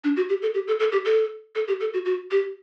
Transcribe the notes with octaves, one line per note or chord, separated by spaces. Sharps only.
D4
F#4
G4
A4
G4
A4
A4
G4
A4
A4
G4
A4
F#4
F#4
G4